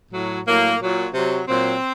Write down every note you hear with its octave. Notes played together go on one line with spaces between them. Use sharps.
A2 F#3
A2 F#3 A#3
A#2 F#3
C3 F#3
A#2 F#3 C4